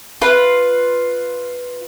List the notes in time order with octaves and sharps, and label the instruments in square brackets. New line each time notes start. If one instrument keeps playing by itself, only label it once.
[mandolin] F4 B4